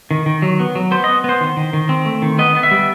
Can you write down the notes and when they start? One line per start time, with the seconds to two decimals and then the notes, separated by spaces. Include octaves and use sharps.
0.11 D#3
0.26 D#3
0.42 F#3
0.59 B3
0.75 F#3
0.91 B3 C5
1.04 B3 D#5
1.24 B3 C5
1.41 D#3
1.57 D#3
1.73 D#3
1.89 C4
2.06 A3
2.22 D#3
2.39 B3 D#5
2.55 B3
2.63 E5
2.71 G3